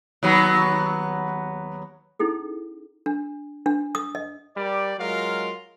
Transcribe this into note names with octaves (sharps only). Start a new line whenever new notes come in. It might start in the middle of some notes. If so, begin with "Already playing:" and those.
D#2 F#3 B3
C#4 D#4 E4 G#4 A4
D4
D4
D#6
D#5
G3 A#4 D5
F#3 G#3 F4 A#4 F5